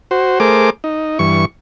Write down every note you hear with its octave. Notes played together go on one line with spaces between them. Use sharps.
F#4 C5
A3 G#4 A#4 C5 D6
D#4
G2 E3 C#6